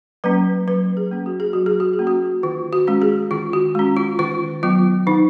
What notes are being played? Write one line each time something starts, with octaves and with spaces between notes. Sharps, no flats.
F#3 A#3 C#4 B4
F#3 B4
G#4
A#3 C#4
F#4
G#4
F#3 F#4
G#4
F#4
G#4
A#3 C#4
F#4
D#3 F4
F#4
G#3 C#4
G#4
D#3 F4
F#4
G#3 C#4
F4
D#3 F4
F#3 B3 F4
D#3 D#4